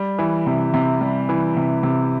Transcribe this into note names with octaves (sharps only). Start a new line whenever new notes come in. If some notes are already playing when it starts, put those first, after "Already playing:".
Already playing: G3
E3
C3
C3
G3
E3
C3
C3